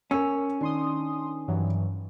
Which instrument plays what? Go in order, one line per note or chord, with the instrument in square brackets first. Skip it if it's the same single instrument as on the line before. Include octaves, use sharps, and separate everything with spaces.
[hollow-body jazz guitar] C#4 [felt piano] A#4 E6
[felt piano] D#3 [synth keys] D4 C6 D#6
[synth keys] G2 E3 F#3